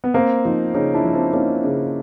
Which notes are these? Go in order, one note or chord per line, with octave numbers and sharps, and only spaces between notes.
B3
A#3 C4
F3 D#4 F4
C#3 C#4 D#4
D4 E4
F3
C4 D4
A#3 C#4 D#4
C#3